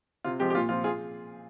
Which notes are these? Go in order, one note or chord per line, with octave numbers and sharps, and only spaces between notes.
C3 F4
F3 G#3 C4 G4
G4
A#2 F4
F3 C4 F4
F4 G#4